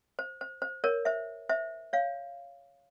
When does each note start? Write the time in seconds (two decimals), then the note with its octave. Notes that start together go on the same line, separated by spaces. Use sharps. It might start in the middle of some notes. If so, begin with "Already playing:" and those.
0.19 C5
0.41 C5
0.62 C5
0.84 A#4 C#5
1.05 C5 E5
1.49 C5 E5
1.93 C#5 F5